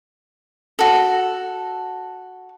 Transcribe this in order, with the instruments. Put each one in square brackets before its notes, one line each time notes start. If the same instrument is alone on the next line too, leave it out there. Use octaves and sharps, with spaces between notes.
[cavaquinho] F#4 A4